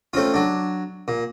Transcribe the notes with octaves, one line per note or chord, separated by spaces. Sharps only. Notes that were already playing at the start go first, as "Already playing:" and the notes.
A3 C4 C#4 F4
F#3 D4
A#2